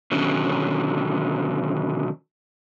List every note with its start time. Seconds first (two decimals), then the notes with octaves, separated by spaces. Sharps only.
0.11 B2 D3 D#3 F#3 C#4 G4